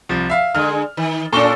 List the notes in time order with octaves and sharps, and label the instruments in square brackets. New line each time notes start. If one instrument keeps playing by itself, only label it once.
[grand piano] C2 F3
E5 F5
[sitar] D3 G#3 [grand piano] F6
[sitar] D#3
[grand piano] A#2 C#6 [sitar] C#4 F4 A4